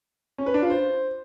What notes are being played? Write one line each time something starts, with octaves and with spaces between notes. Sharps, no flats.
C#4
B4
D4
F4
C5